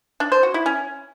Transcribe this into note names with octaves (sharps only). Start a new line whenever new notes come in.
D4
C5
F#4
E4
C#4